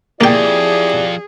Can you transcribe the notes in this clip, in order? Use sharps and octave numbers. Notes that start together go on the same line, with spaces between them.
F2 A#3 E4 G4 G#4 D5 G5